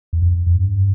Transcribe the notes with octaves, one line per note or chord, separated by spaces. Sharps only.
E2
F2
F2
G2